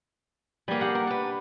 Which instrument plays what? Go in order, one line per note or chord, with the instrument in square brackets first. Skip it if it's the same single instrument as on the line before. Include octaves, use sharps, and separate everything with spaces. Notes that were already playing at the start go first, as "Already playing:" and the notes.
[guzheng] G3 G4 [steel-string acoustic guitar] A#3 G#4
[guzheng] G4 F#5
[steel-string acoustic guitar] A#4
D4 B4